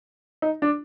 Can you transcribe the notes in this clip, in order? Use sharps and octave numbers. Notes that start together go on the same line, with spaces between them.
D#4
D4